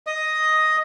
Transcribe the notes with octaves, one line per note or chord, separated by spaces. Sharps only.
D#5 D#6